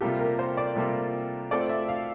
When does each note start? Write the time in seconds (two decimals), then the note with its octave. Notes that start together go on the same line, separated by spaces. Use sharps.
0.01 C3 G3 A#3 F4 G4 A4
0.19 A#4
0.39 C5
0.57 D5
0.75 C3 G3 A#3 F4 A4
1.51 A3 C4 F4 A4 D5
1.69 E5
1.88 F5